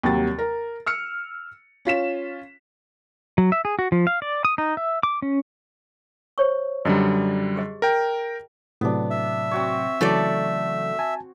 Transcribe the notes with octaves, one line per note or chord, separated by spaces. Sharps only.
D#2 C3 F#3 G3 A6
A#4
E6 F6 C#7
C#4 F4 B6 E7
F#3
E5
G#4
F#4
F3
F5
D5
D#6
D#4
E5
D6
C#4
C5 C#5 C#6
F#2 D3 G3 D5 D#5 A#5
G4 G#4 D#5
A#4 G5
A2 C3 F#3 B3 D4
E5
C4 F#4 C#5
C#3 E3 F#3 A3 A4 D5
G#5 A5